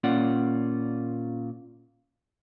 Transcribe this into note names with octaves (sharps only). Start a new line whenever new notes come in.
A#2 C#4 F4 D5 F#5